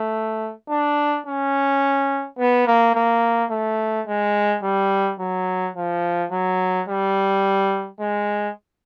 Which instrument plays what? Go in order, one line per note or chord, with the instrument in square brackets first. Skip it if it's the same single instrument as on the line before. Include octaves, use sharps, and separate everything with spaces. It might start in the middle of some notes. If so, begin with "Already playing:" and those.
Already playing: [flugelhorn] A3
D4
C#4
B3
A#3
A#3
A3
G#3
G3
F#3
F3
F#3
G3
G#3